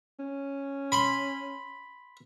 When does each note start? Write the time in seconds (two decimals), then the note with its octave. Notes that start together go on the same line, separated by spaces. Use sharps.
0.19 C#4
0.92 B5 C6